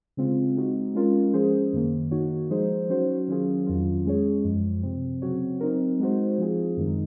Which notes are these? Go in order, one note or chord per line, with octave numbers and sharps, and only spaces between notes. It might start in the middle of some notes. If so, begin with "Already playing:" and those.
C#3 G#3 C4 F4
G#3 C4 D#4 F#4
G#3 C#4 F4 A#4
F3 G#3 C#4 G#4 C5
F#2 D#3 A#3
D#3 A#3 D#4 F#4 C#5
F3 G#3 D#4 G#4 C5
F#3 C#4 F#4 C5
D#3 F#3 C#4 F4 G#4
F2 D#3 F#3 C#4 F4
G#3 C#4 G#4 C#5
F#2 F3 G#3
C3 F3 C4
C#3 F#3 C4 F#4 C#5
F#3 C4 D#4 A#4
G#3 D#4 F#4 C5
F3 C4 F4 G#4
F#2 D#3 G#3 D#4